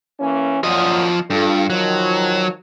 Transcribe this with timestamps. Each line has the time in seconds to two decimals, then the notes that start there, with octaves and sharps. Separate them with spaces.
0.20 E3 A#3 C#4
0.64 A#2 F3 F#3 D#5
1.30 G2 F4 A4
1.70 D#3 F3 F#3